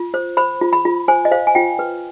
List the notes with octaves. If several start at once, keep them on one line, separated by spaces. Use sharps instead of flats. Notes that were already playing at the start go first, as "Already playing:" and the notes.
Already playing: F4
C5
C5 B5
F4
B5
F4
C5 G#5
D#5
C5 F5
G#5
F4 G5
B4